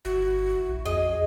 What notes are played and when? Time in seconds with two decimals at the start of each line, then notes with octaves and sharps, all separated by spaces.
0.05 G1 E4 F#4
0.69 A#1
0.86 F2 G#4 D#5